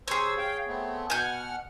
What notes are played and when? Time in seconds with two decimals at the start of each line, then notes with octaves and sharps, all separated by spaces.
0.08 C3 G#4 C5 C#5 E6
0.38 F5 G5
0.68 A3 B3 C4
1.10 B2 F#5 G#5 F6 G6